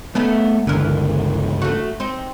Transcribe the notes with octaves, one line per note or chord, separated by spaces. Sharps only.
A3 B3 C#4 D#4
G1 C#2 D3 E3 A#4
A3 F#4
C4 D#4